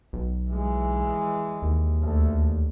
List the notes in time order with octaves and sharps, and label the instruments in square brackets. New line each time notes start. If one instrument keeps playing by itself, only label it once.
[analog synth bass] B1
[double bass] E3 G#3
[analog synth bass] D#2
[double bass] D2